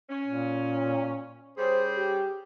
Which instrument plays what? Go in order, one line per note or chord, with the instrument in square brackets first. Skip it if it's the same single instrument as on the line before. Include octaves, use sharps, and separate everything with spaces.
[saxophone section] C#4
[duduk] A#2
[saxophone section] G3 C#4 G#4 [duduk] C5
[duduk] G4